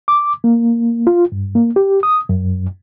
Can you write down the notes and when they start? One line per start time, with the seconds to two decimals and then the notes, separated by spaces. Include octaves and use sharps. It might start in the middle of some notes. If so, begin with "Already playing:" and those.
0.08 D6
0.44 A#3
1.07 F4
1.32 G2
1.55 A#3
1.76 G4
2.03 D#6
2.29 F#2